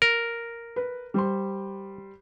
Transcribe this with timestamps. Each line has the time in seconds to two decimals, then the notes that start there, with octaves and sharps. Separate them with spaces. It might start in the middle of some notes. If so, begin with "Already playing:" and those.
0.02 A#4
0.76 B4
1.14 G3 C5 C6